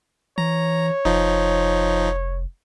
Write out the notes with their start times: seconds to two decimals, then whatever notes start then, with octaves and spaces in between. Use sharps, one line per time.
0.38 E3 C#5 A#5
1.05 F1 F3 D#4